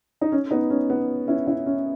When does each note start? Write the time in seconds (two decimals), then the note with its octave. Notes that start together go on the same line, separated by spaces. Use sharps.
0.21 D#4
0.32 C#4
0.51 B3 D#4
0.70 C#4
0.90 B3
1.27 C#4 E4
1.47 C#4 E4
1.66 C#4